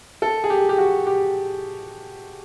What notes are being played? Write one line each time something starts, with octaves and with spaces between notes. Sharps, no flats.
A4
G#4
G4
G4
F#4
G4